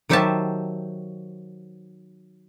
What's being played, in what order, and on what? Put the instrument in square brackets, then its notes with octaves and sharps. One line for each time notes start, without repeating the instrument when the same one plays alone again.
[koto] D#3 F#3 G4 C5 E5 A5